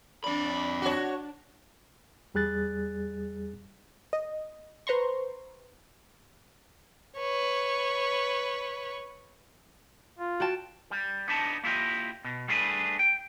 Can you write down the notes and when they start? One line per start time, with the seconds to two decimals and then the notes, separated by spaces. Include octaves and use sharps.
0.24 F2 D4 D5 B5
0.82 D4 F#4 C#5
2.34 E2 G3 G#4 F#6 A6
4.13 D#5
4.87 B4 C5 A#5 C6 C#6
7.18 B4 C#5
10.19 F4
10.40 F#4 G5 A5
10.91 G3
11.28 B3 D4 D#4 A5
11.64 A#3 E4 F4 G4 D#5
12.24 B2
12.48 G3 A3 D4 G#4 A#4 B4
12.99 G5